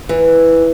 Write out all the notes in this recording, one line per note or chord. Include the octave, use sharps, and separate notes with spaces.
E3